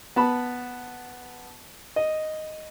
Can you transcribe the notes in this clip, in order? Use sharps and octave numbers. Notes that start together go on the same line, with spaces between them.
B3 A5 B5
D#5